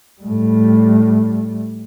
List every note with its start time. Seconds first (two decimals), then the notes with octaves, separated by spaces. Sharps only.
0.21 A2 G3